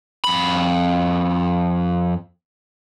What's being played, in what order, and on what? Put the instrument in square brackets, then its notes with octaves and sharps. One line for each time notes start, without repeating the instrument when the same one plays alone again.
[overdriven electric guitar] F2 B5